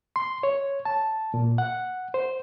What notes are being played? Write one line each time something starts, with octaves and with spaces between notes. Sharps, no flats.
C6
C#5
A5
A#2
F#5
C5